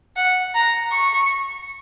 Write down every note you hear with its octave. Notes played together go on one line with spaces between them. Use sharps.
F#5
A#5
C#6